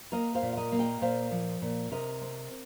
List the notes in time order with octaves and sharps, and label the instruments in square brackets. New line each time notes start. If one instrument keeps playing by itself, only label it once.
[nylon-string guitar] A#3 A#4 D#5
C5 F5
A#2
F5
A#4 D#5
A#3
D#5 G5
A#2 C5 F5
F3
A#2
C3 A#4 D#5
C4